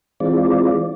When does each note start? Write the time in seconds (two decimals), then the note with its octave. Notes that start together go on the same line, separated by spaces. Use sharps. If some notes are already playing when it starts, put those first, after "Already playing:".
0.20 E3 G#3 C4 F4 D5